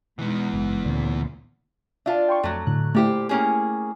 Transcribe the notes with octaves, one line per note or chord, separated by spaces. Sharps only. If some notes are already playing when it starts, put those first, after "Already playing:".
B2 E3 G#3 B3 D#4
F#1 G#2
D2 A#2 C#3
D4 F4 E5 A5
G5 C6 C#6
F2 F#3 A3
A2 D3 F#6
A#2 A3 E4 G4 C5
A#3 C#4 G#4